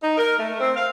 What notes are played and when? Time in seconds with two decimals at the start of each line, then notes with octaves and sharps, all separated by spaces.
0.02 D#4
0.17 A#4
0.38 A3
0.59 C4
0.75 F5